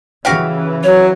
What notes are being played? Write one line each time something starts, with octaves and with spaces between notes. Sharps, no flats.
C#3 E3 F#4 G4 F5
F#3 C#5